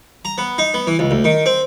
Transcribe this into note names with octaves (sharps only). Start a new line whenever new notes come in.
A#5
B3
D#4
B3
E3
C#2
D2
D#3
C4